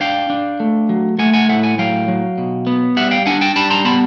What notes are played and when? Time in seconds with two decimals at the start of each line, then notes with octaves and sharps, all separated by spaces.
0.01 D4 F5 G5
0.30 D4
0.60 A3
0.89 F#3
1.19 A3 F#5 G#5
1.34 F#5 G#5
1.49 A2 E5 F#5
1.63 F#5 G#5
1.78 F#3 F5 G5
2.08 F#3
2.38 B2
2.67 B3
2.97 G3 E5 F#5
3.11 F5 G5
3.26 D4 F#5 G#5
3.41 G5 A5
3.56 G3 A5 B5
3.70 A#5 C6
3.85 B3 A5 B5